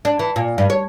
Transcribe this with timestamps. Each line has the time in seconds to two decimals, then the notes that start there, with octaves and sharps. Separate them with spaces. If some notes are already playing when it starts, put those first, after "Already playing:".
0.05 D4
0.19 E3
0.36 A#2
0.58 G2
0.70 C#5